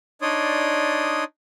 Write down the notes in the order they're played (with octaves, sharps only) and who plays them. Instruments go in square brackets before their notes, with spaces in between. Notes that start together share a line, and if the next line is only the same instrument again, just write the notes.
[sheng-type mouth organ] D4 D#4 C#5 D5 C6 D#6